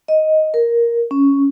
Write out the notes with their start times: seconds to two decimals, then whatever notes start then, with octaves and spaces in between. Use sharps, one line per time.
0.08 D#5
0.54 A#4
1.11 C#4